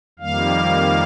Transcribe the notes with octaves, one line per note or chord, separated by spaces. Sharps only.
F2 D#3 G3 A#3 F5